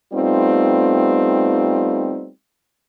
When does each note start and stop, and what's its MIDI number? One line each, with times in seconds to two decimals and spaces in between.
0.13 2.28 55
0.13 2.28 57
0.13 2.28 59
0.13 2.28 60
0.13 2.28 63
0.13 2.28 65